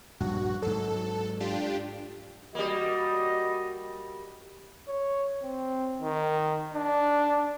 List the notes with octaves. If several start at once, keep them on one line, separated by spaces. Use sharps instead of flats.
A#1 G2 F#4
G#2 F#3 A4
D4 F4 G4
G3 A#3 F#4 D#5
C#5
C4
D#3
D4